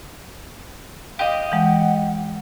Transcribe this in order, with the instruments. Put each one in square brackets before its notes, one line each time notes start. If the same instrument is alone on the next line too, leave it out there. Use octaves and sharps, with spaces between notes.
[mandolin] G4 D#5 [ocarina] F5
[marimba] E3 G#3 [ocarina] F#5